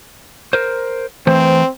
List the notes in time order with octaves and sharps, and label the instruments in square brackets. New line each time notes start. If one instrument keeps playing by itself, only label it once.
[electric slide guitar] A#4 C5
[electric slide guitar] E3 A3 C5 [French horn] C4